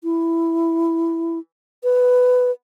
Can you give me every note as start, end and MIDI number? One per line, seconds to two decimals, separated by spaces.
0.04 1.39 64
1.84 2.51 71